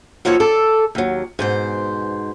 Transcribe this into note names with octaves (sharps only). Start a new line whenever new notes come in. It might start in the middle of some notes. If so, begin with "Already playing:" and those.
D#3 F3 F#3 A#3 A4 C#5
A4 D5
D#2 F#3
G#2 B2 C5